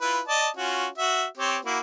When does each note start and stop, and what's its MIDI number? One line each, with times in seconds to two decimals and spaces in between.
0.01 0.21 64
0.01 0.21 65
0.01 0.21 71
0.28 0.49 74
0.28 0.49 75
0.28 0.49 81
0.56 0.87 61
0.56 0.87 65
0.56 0.87 66
0.98 1.26 66
0.98 1.26 76
1.37 1.58 60
1.37 1.58 67
1.37 1.58 73
1.65 1.80 58
1.65 1.80 64
1.65 1.80 66